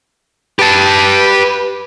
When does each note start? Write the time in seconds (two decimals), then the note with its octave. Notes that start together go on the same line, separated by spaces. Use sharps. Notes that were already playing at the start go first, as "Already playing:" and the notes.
0.59 G4 B4 A5